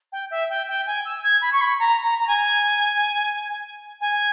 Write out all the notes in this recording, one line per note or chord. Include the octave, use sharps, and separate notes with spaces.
G5
E5
G5
G5
G#5
E6
G#6
B5
C#6
B5
A#5
A#5
A#5
G#5
G#5